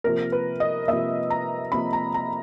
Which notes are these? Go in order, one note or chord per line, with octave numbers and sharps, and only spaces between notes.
C3 F3 A#3 A#4
B4
D#5
C3 F3 A#3 E5
A#5
C3 F3 A#3 B5
A#5
A#5